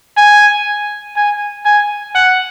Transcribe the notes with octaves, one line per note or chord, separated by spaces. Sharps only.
G#5
G#5
G#5
F#5